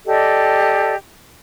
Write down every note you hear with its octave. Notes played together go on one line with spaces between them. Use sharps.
G4 A4 D5 D#5